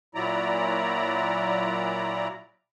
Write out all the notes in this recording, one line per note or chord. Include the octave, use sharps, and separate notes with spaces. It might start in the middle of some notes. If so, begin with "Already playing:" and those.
A#2 F#3 E4 D5 A#5